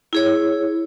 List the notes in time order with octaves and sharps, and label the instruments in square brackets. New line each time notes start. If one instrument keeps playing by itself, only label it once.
[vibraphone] E4 G#4 C#5